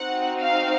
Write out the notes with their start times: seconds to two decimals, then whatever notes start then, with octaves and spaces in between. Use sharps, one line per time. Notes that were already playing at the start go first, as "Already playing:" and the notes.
Already playing: C4 D#4 F#4 F#5
0.40 F5